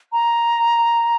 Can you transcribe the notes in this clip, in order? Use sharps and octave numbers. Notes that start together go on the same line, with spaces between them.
A#5